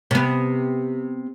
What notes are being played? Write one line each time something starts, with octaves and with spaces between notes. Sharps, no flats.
C3 B3